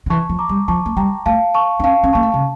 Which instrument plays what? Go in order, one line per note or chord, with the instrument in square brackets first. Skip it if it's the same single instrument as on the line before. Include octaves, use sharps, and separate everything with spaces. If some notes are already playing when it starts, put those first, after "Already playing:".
[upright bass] D3
[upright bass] E3 [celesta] A5 C#6
[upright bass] F3
[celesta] A#5 D6
[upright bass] G3
[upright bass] F3 [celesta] A5 C#6
[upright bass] A3
[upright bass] G3 [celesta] G5 A#5
[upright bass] A3 [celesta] F5 A5
[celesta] A5 C#6
[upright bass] D4
[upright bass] C#4 [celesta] F5 A5
[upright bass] C#4
[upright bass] A#3 [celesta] A5 C#6
[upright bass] A3
[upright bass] C#3 [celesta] A5